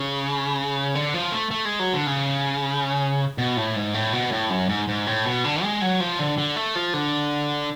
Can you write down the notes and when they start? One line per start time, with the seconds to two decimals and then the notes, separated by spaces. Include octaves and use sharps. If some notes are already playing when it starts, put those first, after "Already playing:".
Already playing: C#3
0.95 D3
1.14 F3
1.32 A3
1.51 A3
1.65 G#3
1.79 F#3
1.93 D3
2.07 C#3
3.38 B2
3.57 A2
3.76 G#2
3.94 A2
4.13 B2
4.32 A2
4.50 F#2
4.69 G#2
4.88 G#2
5.07 A2
5.25 B2
5.44 D3
5.63 G#3
5.82 F#3
6.00 F3
6.19 D3
6.38 D3
6.56 A3
6.75 F3
6.94 D3